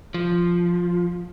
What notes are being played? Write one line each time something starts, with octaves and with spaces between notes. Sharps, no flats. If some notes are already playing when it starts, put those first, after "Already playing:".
F3